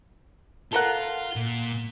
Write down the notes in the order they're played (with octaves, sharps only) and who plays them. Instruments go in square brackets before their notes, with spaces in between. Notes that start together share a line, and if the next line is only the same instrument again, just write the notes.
[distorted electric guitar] F4 [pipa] A4 A#4 F#5
[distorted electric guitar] A#2